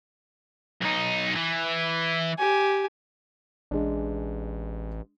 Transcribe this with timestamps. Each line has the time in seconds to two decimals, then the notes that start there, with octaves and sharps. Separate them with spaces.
0.82 B1 D#4
1.36 E3
2.39 G4 G#5
3.71 A1 G#3 D4